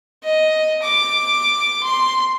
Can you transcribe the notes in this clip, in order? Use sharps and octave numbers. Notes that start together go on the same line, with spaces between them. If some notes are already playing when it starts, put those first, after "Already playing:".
D#5
D6
C6